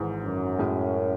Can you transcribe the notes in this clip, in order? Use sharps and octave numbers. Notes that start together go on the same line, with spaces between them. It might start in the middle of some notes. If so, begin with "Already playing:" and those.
Already playing: G#1 G#2 E3
F#2
A2 G#3 C#4